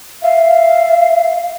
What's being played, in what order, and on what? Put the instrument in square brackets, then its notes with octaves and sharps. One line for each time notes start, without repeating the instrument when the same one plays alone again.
[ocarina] E5 [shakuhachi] F5